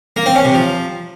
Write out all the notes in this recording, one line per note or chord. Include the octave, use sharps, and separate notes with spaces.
A#3
C4
C#4
C3
F3